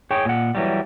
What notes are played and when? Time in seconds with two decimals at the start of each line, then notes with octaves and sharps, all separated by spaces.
0.11 G#4 C#5 G5
0.25 A#2 F#5
0.55 E3 F#3 G3